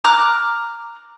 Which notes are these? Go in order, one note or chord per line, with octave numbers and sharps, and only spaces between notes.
A#5 D6 F6 F#6